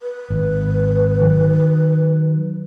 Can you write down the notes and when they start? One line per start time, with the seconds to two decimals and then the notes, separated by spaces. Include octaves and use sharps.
0.02 B4
0.30 G#1
1.21 D#3 F#3